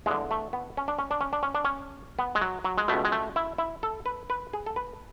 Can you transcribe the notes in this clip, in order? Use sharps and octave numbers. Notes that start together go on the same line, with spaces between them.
E2 D3 G#3
A3
B3
C#4
D4
C#4
D4
C#4
D4
C#4
D4
C#4
B3
G#3
F#3
F#3
G#3
C#2 B2 A3
G#3
A3
E4
E4
A4
B4
B4
G#4
A4
B4